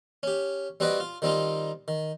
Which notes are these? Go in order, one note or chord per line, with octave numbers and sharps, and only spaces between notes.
C#4 G4
G3 C4 F#4 B4 D5 D#5
F4
D#3 G3 C4 D#4 F4
D#3